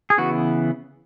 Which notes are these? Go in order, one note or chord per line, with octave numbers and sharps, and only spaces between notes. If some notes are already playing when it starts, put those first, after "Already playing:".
G#4
C#3 E3 B3 F#4